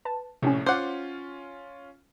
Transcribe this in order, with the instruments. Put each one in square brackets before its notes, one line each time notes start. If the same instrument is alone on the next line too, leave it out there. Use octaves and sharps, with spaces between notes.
[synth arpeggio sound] B4 A5
[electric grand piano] A#1 A2 [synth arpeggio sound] C3 C4 C#4
[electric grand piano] C#4 F4 [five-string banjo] C5 F#5 [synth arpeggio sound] D6